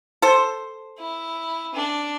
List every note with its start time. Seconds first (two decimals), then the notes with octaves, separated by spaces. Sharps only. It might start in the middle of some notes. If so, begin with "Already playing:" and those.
0.22 A4 C5
0.98 E4
1.74 D4